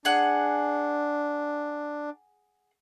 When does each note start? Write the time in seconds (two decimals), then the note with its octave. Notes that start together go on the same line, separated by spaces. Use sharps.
0.05 D4 G#4 F#5